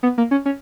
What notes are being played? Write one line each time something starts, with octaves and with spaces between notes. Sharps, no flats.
B3
A#3
C#4
C#4